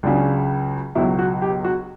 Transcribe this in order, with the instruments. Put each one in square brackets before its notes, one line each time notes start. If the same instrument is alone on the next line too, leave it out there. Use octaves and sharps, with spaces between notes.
[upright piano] C#2 C#3 F#3 D4
C#2 B2 F#3 E4
F#4
G4
F#4